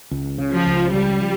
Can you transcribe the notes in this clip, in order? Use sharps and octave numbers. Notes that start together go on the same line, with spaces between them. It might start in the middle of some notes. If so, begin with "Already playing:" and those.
C#2
C#3
F3
C#2
C#3 G3
F3